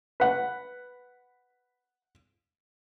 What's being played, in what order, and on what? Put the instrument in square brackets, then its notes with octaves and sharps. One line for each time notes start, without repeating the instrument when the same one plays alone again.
[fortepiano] B4 F#5